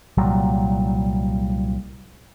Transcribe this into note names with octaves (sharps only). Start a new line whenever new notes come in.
C2 A#2 F#3 G3